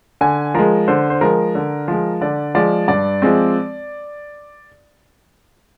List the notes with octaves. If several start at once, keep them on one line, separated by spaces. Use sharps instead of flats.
D3 G#5
F3 G#3 A#4
D3 C5
C5
F3 G#3 A#4
D3
F3 G#3
D3 D5
F3 G#3 D5
G2 D5
F3 G#3 C4